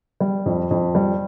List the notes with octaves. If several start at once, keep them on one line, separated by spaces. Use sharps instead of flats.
G3
F2
F2
G3